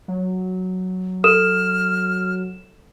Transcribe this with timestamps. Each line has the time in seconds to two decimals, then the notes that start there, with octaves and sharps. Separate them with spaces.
0.08 F#3
1.24 A4 F6 E7